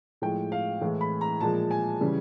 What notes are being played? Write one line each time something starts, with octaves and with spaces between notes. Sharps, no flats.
A2 F3 G#3 G5
F5
A2 E3 G#3
B5
A#5
A#2 F3 G#3 A5
G#5
C#3 E3 G3